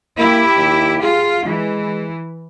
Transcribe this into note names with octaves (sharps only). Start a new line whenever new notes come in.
A#3 E4 G4
D#2
F4 G#4
E3 G#3